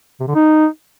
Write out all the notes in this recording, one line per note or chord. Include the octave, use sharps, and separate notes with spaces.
C3
D3
D#4